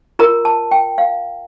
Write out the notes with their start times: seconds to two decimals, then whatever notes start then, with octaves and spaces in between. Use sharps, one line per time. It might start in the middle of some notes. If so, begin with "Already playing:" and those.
0.19 F4 A#4 A#5
0.45 A5
0.71 G5
0.98 F5